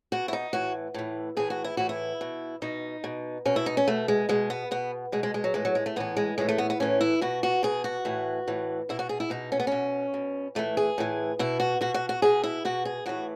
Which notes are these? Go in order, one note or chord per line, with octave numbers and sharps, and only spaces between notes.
B2 F#4
E4
D#4
A2 E3 F#4
A2 E3
A2 E3 G#4
F#4
E4
A2 E3 F#4
E4
B2
B2 D#4
B2
B2 C#4
E4
D#4
C#4
B2 A3
G#3
B2 G#3
B3
B2 B3
B2 G#3
G#3
G#3
F#3
A2 E3 G#3
F#3
G#3
A3
A2 E3 B3
G#3
A2 E3 G#3
A3
B3
B3
A2 E3 C#4
E4
B2 F#4
F#4
B2 G#4
F#4
A2 E3
A2 E3
B2 E4
F#4
G#4
E4
B2 D#4
C#4
B3
B2 C#4
B2
A2 E3 A3
G#4
A2 E3
B2 E4
F#4
B2 F#4
F#4
F#4
B2 G#4
E4
B2 F#4
G#4
A2 E3 F#4